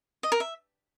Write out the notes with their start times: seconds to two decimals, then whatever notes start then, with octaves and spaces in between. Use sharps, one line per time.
0.23 D#5
0.32 A#4
0.40 E5